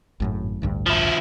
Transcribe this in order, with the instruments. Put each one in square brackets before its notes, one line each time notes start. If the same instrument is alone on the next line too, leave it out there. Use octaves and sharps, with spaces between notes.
[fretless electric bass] G#1 F#2 A2
A1 D2 G2
[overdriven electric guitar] F3 E4